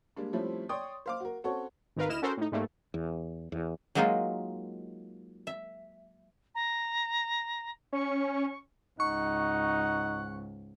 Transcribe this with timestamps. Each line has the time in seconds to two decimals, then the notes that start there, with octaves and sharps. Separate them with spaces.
0.16 G3 G#3 A#3 D4
0.33 F3 G3 A3 C4 C#4 E4
0.69 C#5 D5 G5 C6 C#6 D#6
1.06 C5 F5 D6
1.20 F#4 A#4
1.44 C4 C#4 F#4 A4 C#5
1.96 G#1 D#3 A#4 B4 F5
2.08 D2 E4 D#5 F6 E7
2.22 C#4 F#4 A4 A#4 C5
2.37 A2 D#4
2.52 G#2 G3 A3 A#3
2.94 E2
3.52 E2
3.95 F#3 G#3 A#3 D#4 F4
5.47 E5
6.54 A#5
7.93 C#4 C#6
9.00 C#2 G#2 D#4 F#5 C#6